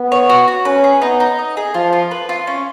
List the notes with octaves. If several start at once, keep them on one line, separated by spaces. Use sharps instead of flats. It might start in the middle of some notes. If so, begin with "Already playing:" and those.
Already playing: B3
C#5
F#4
F#4
C#4 B4
G#4
B3 D#4
D#4
D#5
G#4
F3 F4
F4
B4
F4
C#4